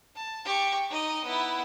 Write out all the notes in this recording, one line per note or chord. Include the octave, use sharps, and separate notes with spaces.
A5
G4 C#6
D#4 D#5
B3 E4